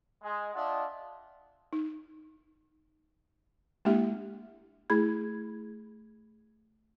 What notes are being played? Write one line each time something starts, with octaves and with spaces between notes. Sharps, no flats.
G#3
D4 F4 D#5 E5 F#5
D#4
G#3 A#3 D4 E4 G4 E5
A3 E4 G#4 B5 G#6